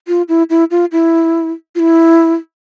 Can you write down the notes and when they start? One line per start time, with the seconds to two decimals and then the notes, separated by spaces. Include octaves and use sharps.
0.08 F4
0.29 E4
0.50 E4
0.71 F4
0.92 E4
1.75 F4
1.79 E4